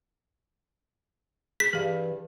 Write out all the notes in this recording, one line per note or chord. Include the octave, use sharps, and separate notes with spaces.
G#4 B6
G2 E3 G4 F5